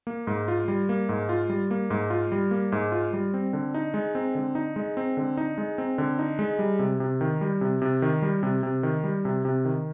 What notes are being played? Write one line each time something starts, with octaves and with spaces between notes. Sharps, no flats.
A#3
G#2
F4
G3
A#3
G#2
F4
G3
A#3
G#2
F4
G3
A#3
G#2
F4
G3
C4
D3
D#4
G#3
C4
D3
D#4
G#3
C4
D3
D#4
G#3
C4
D3
D#4
G#3
G3
C3
C3
D#3
G3
C3
C3
D#3
G3
C3
C3
D#3
G3
C3
C3
D#3